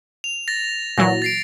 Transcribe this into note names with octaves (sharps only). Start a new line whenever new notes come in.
F7
A6 A#6
A#2 E3 F#3 A#6
A6 C7 D7